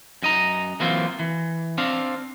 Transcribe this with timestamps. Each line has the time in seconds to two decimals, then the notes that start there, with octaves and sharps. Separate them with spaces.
0.23 F#2 D#5 A#5
0.80 E3 F#3 A#3 C4 F4
1.19 E3
1.78 C4 D4 F5